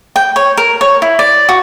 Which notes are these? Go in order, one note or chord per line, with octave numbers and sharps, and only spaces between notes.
G5
C#5
A#4
C#5
E4
D5
F#4